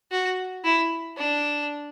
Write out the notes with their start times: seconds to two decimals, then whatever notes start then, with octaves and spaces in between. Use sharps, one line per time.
0.11 F#4
0.64 E4
1.17 D4